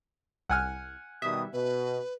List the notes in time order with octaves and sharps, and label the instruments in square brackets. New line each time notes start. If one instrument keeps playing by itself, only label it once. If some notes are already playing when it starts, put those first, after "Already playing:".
[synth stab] C2 [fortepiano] F#5 G#5 F6
[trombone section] B2 D#3 G3 [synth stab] E5 [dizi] D#6
[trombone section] B2 [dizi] B4